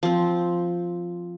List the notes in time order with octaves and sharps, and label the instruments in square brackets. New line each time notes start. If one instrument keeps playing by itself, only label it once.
[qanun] F3 C4